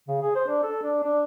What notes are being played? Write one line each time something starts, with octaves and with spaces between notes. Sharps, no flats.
C#3
G#4
C5
D4
A4
D4
D4